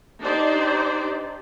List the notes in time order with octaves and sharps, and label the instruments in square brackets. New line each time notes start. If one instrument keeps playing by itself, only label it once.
[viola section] D4 D#4 G4 C5 D5